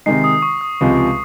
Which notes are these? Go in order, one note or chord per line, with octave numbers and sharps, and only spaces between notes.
C3 D#3 G#3 D#4 C7
D#6
C#6
D#6
C#2 C3 F3 G#3